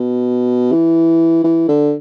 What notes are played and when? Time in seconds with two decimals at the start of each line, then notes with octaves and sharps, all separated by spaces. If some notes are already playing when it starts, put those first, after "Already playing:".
Already playing: B2
0.72 E3
1.44 E3
1.69 D3